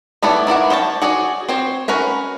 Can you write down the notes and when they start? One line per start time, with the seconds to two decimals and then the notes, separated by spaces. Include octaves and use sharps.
0.23 A3 B3 E4 C#5 D5
0.47 D#3 E4 D5 F#5
0.70 C5 C#5 E5 A5
1.02 F#4 G#4 C#5 D5
1.49 C4 C5 C#5
1.88 C#4 F#4 A#4 B4